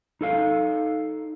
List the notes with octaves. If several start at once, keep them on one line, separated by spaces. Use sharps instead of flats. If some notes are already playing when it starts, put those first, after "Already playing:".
D#4 A4 F5